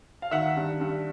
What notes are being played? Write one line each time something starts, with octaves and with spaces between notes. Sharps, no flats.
F5
D#3 E5 F#5
G2
G2